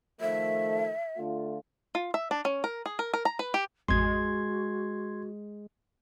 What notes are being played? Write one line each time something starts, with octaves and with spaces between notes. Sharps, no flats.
D#3 F3 A3 E5
D3 A3 F4
F4
E5
D4
C#4
A#4
G#4
A#4
A#4
A#5
B4
G4
A1 F2 G#3 F#4 C6 G#6